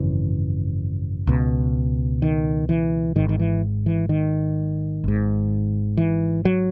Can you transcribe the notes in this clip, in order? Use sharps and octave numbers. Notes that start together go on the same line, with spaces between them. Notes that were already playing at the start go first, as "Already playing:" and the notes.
Already playing: G#1 F#2 C#3 E3
C#2 B2
D#3
E3
G#1 G#2 D#3
D#3
E3
E3
D#3
G#1 G#2
E3
F#3